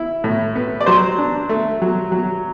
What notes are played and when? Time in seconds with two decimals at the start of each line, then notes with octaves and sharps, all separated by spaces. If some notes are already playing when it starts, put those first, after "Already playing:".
Already playing: E4
0.24 A2
0.55 B3
0.81 D5
0.86 F#3 C5
1.18 D4
1.49 A3
1.82 F#3
2.12 F#3